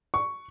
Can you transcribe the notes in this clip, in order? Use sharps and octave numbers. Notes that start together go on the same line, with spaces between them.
C#6